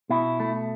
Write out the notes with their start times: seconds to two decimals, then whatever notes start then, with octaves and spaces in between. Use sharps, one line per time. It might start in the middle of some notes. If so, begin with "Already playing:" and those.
0.09 B2 E4
0.40 A3